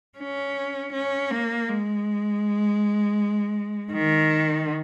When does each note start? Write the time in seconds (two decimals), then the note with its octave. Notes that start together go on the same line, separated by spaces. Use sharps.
0.19 C#4
0.93 C#4
1.31 A#3
1.68 G#3
3.92 D#3